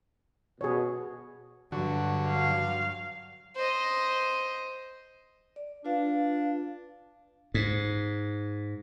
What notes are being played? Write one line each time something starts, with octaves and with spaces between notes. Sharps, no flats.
B2 G#4 C#5
G2 D3 F#3 F#4
F5
C5 D#5
D5
D4 F4 B4 F5
G#2